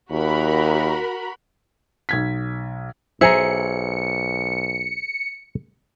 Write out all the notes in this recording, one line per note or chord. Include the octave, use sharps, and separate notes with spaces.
D#2 F#4 A#4 B5
B1 G#6 B6
B1 G#4 C5 E5 G#5 A#5 C#7